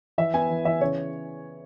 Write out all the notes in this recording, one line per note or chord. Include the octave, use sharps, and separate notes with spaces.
E3 E5
B3 G#5
E3
E3 E5
C#3 C#5